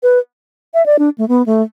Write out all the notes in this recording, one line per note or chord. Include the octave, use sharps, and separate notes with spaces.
B4
E5
D5
D4
A3
B3
A3